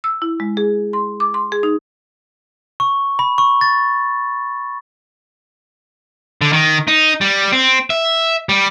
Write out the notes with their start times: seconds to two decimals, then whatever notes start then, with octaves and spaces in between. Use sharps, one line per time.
0.04 E6
0.22 E4
0.40 G#3
0.57 G#4
0.93 C6
1.20 D6
1.34 C6
1.52 G#4
1.63 D#4
2.80 C#6
3.19 B5
3.38 C#6
3.61 A6
6.41 D3
6.53 D#3
6.88 D#4
7.21 G3
7.53 C4
7.90 E5
8.49 G3